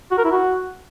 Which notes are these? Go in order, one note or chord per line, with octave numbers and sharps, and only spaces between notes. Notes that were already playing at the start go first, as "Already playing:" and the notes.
F#4
A#4
E4
F#4